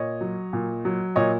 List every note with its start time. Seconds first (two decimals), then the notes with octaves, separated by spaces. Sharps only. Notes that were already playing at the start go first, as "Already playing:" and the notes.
Already playing: A#2 C#5 D#5
0.21 F#3
0.53 A#2
0.85 F#3
1.16 A#2 C#5 D#5